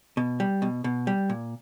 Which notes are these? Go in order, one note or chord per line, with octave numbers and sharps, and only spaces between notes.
B2
G3
B2
B2
G3
A#2